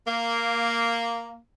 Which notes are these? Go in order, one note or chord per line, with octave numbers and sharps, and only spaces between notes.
A#3